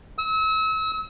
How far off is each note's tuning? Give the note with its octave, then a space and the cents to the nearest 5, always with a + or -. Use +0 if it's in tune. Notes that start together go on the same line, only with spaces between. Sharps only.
E6 -35